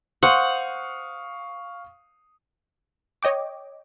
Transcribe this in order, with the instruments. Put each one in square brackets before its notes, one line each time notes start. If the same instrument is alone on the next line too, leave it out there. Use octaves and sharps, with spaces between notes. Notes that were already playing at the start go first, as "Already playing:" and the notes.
[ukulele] C5 [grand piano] F5 C#6 D#6 [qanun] F#5
[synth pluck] C#5 D#5 G5 D6